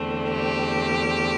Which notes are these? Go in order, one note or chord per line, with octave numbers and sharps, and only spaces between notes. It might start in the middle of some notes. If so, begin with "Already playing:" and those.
Already playing: E2 D3 A3 C4
G4